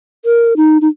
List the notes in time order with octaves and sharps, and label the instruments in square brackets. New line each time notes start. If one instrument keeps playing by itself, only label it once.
[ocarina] A#4
D#4
D#4